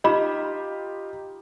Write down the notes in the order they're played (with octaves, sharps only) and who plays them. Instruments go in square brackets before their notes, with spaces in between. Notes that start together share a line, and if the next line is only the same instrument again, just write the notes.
[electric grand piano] D#4 F4 G4 [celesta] D#5 B5